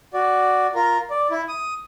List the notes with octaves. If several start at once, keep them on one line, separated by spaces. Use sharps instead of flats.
F#4 D5
F4 A#4
D5
E4
D#6